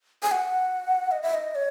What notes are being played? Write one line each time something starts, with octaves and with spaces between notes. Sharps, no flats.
G#5
F#5
D#5
E5
D#5
D#5
C#5